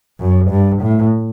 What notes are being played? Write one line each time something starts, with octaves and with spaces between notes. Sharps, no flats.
F#2
G2
A2